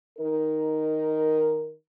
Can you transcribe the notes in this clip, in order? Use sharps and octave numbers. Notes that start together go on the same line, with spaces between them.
D#3 D#4 A#4